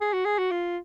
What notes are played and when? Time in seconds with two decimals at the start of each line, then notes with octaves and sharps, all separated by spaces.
0.01 G#4
0.13 F#4
0.25 G#4
0.38 F#4
0.51 F4